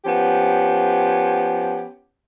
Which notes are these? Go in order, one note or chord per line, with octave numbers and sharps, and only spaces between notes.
F3 B3 C#4 G4